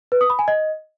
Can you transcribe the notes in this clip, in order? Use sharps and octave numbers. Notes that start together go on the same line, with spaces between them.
B4
D#6
B5
G#5
D#5